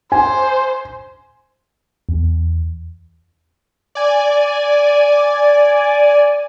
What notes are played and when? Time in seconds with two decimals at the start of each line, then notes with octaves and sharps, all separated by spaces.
0.12 C5 G#5
2.09 E2
3.95 D5 G#5